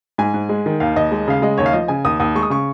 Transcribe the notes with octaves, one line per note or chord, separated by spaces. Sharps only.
G#2 G#5
G#2
G#3
D#3
D#2 F5
D#2 D#5
G#3
C#3 F5
G#3 D#5
D#2 C#5
F5
F3 D#5
C#3 G#5
D#2 D#6
D#2 D#6
G#3 C#6
D#6
C#3 C#6